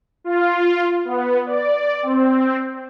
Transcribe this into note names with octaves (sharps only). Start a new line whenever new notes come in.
F4
B3
D5
C4